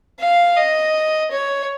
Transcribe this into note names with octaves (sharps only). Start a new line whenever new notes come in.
F5
D#5
C#5